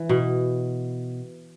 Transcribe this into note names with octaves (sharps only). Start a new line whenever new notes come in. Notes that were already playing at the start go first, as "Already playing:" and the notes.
Already playing: E3
B2